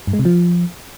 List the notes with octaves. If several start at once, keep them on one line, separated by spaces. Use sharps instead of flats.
G2
G#3
C3
F3